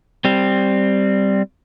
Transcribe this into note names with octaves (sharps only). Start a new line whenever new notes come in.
G3 C4